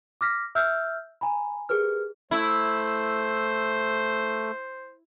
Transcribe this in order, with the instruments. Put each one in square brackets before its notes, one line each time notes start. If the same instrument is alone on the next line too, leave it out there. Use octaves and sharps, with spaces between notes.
[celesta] D6 F6 A#6 B6
E5 E6 F6 G6
G#5 A#5 B5
G4 G#4 A#4 B4 F6
[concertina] A3 [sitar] E4 [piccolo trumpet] C5